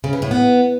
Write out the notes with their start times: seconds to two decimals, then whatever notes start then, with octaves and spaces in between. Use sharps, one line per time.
0.04 C#3
0.13 E3
0.22 A2
0.31 B3